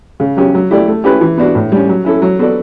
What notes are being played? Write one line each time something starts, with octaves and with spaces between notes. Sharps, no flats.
C#3
F#3 C#4 G4
F#3
A3 E4 G4 D5
A3
C#4 E4 G4 B4
E3
B3 D4 F#4
A2
G3 C#4
F#3
C#4 E4 A4
F#3
B3 F#4 A4 D5